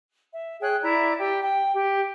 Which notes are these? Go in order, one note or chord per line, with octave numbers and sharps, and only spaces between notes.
E5
G#4 C#5 G5 F#6
E4 D5 E5 A#5
G4 G5
G5
G4